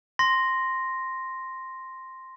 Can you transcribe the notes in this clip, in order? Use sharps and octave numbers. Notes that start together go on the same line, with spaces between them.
C6 A#6